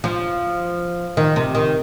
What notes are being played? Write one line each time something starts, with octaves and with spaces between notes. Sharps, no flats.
F3
D#3
C3
D#3